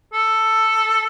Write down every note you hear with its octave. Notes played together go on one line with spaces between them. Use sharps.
A4